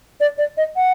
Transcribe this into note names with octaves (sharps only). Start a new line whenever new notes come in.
D5
D5
D#5
F#5